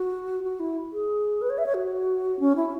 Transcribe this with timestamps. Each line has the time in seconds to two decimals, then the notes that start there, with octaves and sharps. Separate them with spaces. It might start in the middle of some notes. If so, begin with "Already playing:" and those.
Already playing: F#4
0.44 F#4
0.60 E4
0.93 G#4
1.42 B4
1.50 C#5
1.58 E5
1.66 C#5
1.74 F#4
2.40 C#4
2.56 E4